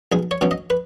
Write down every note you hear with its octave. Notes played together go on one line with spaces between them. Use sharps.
B1 G#4
C#5
B2 F#3 C#4
D#5
B4